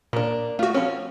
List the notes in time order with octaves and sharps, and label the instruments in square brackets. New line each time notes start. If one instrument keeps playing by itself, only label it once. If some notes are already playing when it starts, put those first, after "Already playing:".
[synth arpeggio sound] A#2 [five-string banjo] A#3 D4
[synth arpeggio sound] A3 F#4 [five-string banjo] F4
[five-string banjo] F3 C#4 [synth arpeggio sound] C4